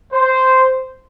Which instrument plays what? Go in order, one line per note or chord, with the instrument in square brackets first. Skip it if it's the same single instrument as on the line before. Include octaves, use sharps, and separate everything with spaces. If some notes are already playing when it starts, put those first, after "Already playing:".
[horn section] C5